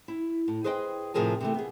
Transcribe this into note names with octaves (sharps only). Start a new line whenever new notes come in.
E4
A2
G#4 B4 C5 D#5 F5 G5
A2 C3 F3 G#4 A#4 G#5
C3 E3 A3
B3 G#4